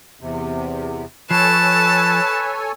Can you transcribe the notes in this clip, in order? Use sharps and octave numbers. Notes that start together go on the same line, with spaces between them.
E2 C3
F3 A4 B4 C#5 G#5 A5